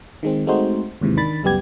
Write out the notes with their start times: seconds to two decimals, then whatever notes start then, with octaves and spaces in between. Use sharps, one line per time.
0.23 D#3 G#3 C4
0.47 G#3 A3 C4 D#4 F#4 C5
1.01 D#2 G#2 C3 E3
1.17 D#3 D4 B5 A6
1.43 C#2 F#2 G3 B3 G4 G#6